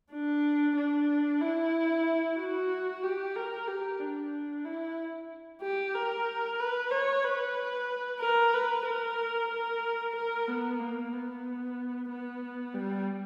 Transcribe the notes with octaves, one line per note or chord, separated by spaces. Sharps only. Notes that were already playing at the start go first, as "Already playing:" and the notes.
D4
D4
E4
F#4
G4
A#4
G4
D4
E4
G4
A#4
B4
C#5
B4
A#4
B4
A#4
A#4
A#4
B3
A#3
B3
B3
G3